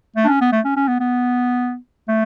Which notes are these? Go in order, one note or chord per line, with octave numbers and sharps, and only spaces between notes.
A3
D4
C#4
B3
A3
C#4
C#4
B3
B3
A3